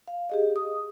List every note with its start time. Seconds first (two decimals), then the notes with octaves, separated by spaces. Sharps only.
0.08 F5
0.30 G4 G#4 D#5
0.56 D#6